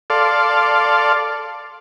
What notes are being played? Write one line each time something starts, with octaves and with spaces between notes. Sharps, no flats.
A4 D5 F5 C6